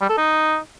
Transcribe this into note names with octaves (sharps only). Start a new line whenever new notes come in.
G3
A4
D#4